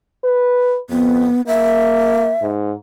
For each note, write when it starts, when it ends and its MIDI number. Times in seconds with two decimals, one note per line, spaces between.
0.24 0.79 71
0.90 1.29 41
0.90 1.41 59
1.47 2.34 58
1.47 2.45 76
2.42 2.72 44